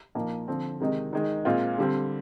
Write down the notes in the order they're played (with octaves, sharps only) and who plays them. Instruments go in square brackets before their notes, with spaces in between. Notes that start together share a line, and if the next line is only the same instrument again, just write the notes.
[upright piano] A#2 F3 A#3 D#4
D3 F3 C4
C3 D#3 G#3 D#4
D#3 G#3 D#4
A#2 G#3 C4 F4
D3 G3 C4